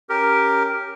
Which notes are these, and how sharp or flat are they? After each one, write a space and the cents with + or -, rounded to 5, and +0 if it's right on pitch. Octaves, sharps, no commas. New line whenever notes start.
C#4 +0 G4 +0 A#4 +0